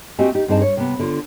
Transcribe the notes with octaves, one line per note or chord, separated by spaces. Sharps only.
A3 C4 F#4 G4 D#5 G#5
D#4 G4
G2 C4 D#4 G#4 D#5 A5
C#5
C3 B3
D3 F4